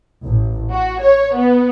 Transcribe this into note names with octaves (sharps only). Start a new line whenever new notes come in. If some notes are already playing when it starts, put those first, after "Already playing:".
A1
F#4
C#5
B3